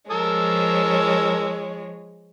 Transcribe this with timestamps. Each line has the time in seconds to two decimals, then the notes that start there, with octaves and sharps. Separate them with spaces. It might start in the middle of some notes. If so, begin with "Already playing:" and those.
0.11 F3 G#3 A#4 C#5 A5 E6